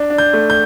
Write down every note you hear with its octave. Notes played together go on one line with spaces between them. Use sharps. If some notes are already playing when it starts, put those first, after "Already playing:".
Already playing: D4
D4
G6
A3
G6